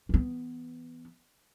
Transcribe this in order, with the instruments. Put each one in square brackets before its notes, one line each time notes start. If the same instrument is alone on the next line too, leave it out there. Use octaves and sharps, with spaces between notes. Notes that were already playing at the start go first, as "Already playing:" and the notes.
[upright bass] E3 B3